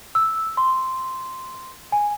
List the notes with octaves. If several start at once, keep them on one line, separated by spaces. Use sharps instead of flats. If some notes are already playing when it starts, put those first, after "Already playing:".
E6
C6
G#5